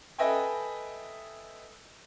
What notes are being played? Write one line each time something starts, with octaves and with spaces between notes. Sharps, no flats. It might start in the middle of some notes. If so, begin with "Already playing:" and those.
A4 B4 D#5 E5 G5 G#5